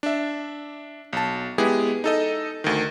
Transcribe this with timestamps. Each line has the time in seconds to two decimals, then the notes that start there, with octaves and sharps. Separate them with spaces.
0.03 D4 E5
1.13 B1 A5
1.58 G#3 B3 E4 G4 G#4
2.04 D#4 A4 D#5
2.64 D2 D#3